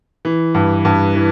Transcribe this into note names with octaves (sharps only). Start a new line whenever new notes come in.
E3
G2
G2
E3